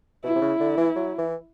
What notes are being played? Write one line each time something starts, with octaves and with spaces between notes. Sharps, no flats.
B2 E4
C3
C#3
D3
E3
F#3
E3